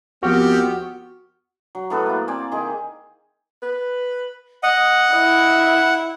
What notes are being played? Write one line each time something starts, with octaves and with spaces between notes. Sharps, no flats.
D#2 F3 B3 C4 F#4 G4 F6
F#3
A2 B3 A4 B4
A#3 E4
C4 D5 G#5
D#3 G#4
B4
D#5 F#5
E4 D#5